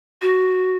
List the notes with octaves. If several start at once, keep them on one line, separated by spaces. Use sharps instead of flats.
F#4